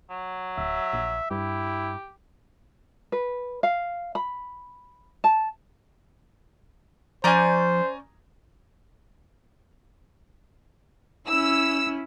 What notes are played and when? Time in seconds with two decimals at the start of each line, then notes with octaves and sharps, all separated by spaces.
0.10 F#3
0.58 D1 E5
0.93 A#1
1.31 G2 E4 G4
3.12 B4
3.63 F5
4.15 B5
5.24 A5
7.24 F3 C#4 C5 D5 G#5 A#5 G6
11.28 C#4 E4 E6